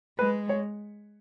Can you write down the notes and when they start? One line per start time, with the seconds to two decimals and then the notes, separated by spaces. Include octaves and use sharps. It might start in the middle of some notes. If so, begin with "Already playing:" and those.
0.19 G#3 B4
0.49 C#5